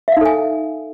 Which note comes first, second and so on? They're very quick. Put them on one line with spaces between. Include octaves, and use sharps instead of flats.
E5 F5 D#4 A4 G#5